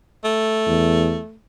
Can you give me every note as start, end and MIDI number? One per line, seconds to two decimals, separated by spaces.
0.24 1.37 57
0.67 1.18 40